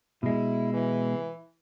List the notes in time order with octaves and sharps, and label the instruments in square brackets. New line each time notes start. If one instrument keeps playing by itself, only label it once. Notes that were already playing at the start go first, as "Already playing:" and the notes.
[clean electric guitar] B2 G#3 [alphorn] E4
[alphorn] E3